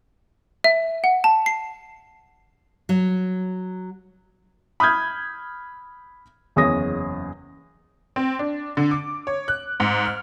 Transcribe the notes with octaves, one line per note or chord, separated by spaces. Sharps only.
E5
F#5
A5
C7
F#3
B5 D#6 F6 G6 G#6
F#1 E2 G#4 C#5 D#6 A#6
C4
D4
D3
D6
C#5
F#6
G#2
F6